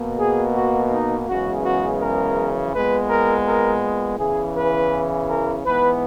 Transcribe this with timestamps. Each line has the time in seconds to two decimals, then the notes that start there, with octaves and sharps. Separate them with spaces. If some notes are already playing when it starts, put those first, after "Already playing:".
Already playing: B2 A#3
0.18 G#4
0.55 F#4
0.91 D#4
1.27 F#2 C#3 E3 G#3 B3 F#4
1.64 F#4
2.00 A#4
2.73 A#2 G#3 B3 B4
3.09 A#4
3.46 A#4
4.18 E2 C#3 E3 G#4
4.55 B4
5.28 A#4
5.65 G#2 E3 B3 B4